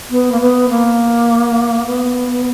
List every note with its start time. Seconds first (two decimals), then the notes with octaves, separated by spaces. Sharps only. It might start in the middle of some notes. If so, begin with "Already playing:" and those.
0.11 B3
0.32 A#3
0.40 B3
0.70 A#3
1.86 B3